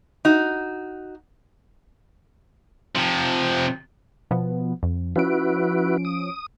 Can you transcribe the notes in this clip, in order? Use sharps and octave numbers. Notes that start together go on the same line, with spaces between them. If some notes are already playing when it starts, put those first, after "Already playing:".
D#4 F#4
C3 F3
B2 F3 B3
F2
F3 C#4 E4 F#4 B4 D7
D#6